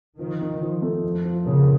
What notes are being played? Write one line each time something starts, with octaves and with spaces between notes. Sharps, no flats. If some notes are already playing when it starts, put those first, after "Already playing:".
D#3 F3
D#4
F3
A3
F2
F3
C#3 A#3